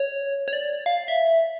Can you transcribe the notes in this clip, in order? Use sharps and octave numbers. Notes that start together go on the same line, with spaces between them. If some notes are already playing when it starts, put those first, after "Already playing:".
Already playing: C#5
C#5
D5
F5
E5